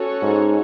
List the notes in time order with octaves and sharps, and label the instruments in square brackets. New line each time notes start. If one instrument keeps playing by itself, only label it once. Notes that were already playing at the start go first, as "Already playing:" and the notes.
Already playing: [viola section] C#4 F#4 A4 C#5
[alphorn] G#2